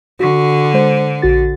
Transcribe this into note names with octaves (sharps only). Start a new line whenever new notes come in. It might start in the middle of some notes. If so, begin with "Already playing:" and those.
D3 F#4 C#6
G#3 C5
A#1 F#4 A6